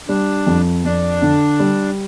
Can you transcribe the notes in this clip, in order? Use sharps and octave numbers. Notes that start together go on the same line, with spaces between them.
G3 D4
F2
F2 D4
D3
G3